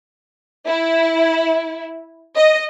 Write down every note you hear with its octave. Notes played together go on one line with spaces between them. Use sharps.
E4
D#5